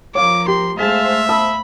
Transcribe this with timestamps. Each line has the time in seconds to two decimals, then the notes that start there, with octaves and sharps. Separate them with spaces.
0.15 F3 A#4 C#5 F5 D6
0.48 G4 C6
0.79 G#3 A3 C5 E5 F5 A5 F6 B6
1.29 A5 B5 D#6 E6